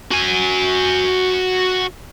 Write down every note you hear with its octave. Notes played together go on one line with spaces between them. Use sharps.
F#4 G#5